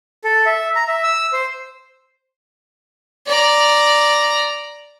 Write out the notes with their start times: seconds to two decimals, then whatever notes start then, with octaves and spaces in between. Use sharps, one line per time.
0.24 A4
0.46 E5
0.76 A#5
0.88 E5
1.04 E6
1.33 C5
3.27 D5 A#5